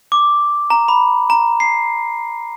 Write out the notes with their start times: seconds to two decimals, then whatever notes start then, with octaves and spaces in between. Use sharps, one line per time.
0.12 D6
0.70 A#5
0.88 B5
1.30 A#5
1.60 C7